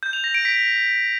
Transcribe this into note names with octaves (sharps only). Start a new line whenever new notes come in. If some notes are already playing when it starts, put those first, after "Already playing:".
G6
F7
A#6
D7
B6